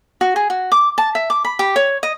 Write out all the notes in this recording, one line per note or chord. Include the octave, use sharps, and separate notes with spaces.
F#4
G#4
F#4
D6
A5
E5
D6
B5
G4
C#5
D#5